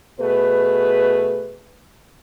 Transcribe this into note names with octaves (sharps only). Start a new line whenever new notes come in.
B2 A3 G#4 B4